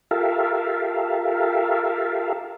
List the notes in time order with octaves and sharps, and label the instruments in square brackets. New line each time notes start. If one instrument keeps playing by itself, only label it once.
[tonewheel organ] F4 G4 A4 A#4 E5 F5